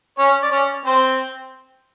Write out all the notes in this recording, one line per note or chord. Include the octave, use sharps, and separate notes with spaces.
C#4 C#5
D5
C#4 C#5
C4 C5